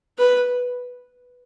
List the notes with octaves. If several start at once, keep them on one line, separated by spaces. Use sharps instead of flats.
B4